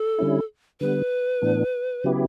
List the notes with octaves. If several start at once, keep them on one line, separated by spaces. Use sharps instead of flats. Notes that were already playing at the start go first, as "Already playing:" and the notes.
Already playing: A4
D3 G3 C#4 E4
D3 G3 B3 B4
A2 E3 B3 D4
C#3 F#3 B3 E4 G4